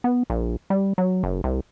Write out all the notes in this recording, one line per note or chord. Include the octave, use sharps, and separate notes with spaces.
B3
A#1
G3
F#3
F#1
C2